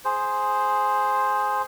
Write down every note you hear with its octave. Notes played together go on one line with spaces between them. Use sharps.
G#4 C5